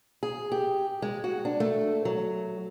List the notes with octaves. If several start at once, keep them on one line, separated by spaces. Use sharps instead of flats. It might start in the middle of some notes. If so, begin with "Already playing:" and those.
G#4
G4
G#3
F#4
D4
A3
F#3